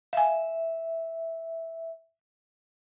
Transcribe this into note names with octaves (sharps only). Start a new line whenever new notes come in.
E5 F5 G#5